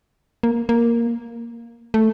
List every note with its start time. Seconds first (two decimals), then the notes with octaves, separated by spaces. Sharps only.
0.43 A#3
0.69 A#3
1.94 A3